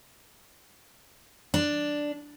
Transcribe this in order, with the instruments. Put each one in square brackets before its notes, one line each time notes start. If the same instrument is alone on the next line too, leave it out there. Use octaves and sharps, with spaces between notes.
[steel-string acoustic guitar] D4